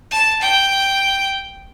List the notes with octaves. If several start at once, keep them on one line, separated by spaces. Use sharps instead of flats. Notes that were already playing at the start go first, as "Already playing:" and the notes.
A5
G5